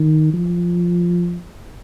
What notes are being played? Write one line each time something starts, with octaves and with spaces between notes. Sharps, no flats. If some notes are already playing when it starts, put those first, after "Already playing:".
Already playing: D#3
F3